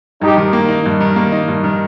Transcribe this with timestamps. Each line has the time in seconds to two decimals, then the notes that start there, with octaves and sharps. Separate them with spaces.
0.22 G2 D#4 G4
0.37 D#3
0.53 A#3
0.69 D#4
0.86 G2
1.01 D#3
1.16 A#3
1.32 D#4
1.48 G2
1.64 D#3